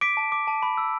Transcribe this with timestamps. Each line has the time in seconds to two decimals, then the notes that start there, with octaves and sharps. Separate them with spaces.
0.01 D6 B6 D7
0.17 A5
0.32 D6
0.47 A5
0.62 B5
0.78 E6